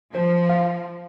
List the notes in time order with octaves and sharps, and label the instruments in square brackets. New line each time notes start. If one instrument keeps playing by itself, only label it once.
[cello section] F3 [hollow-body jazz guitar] C5
[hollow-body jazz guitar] F5